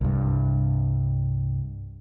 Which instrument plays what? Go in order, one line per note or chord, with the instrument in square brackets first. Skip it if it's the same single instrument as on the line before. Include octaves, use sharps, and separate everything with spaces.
[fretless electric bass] C2 G2